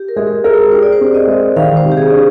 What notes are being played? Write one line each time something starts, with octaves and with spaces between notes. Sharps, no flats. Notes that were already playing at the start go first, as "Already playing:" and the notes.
Already playing: G4
A#4
G#3 G#4
G#4 A#4
G4 C5
D5
C5
C4
D#5
G#3
D#3 F5
C5
C3
G4
G#4
D4